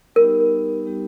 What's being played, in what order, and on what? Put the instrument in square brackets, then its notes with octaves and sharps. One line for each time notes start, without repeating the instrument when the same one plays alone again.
[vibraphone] G3 B3 D#4 G4 [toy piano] A#4
[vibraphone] G3 B3 D#4 G4